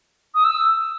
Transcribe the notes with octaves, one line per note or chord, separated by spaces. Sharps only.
D#6
E6